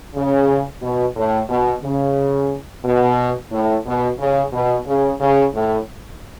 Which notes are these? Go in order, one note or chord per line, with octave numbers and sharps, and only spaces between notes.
C#3
B2
A2
B2
C#3
B2
A2
B2
C#3
B2
C#3
C#3
A2